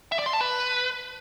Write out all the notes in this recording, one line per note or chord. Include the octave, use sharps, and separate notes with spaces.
E5
D5
C6
A5
B4